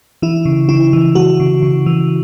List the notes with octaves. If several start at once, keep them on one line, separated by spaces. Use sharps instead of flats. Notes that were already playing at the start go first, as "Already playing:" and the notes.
E3 E4
C#3
C#3 E4
E3
E3 F#4
C#3
C#3
E3